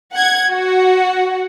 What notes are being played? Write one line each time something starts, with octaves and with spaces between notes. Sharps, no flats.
F#5 G#6
F#4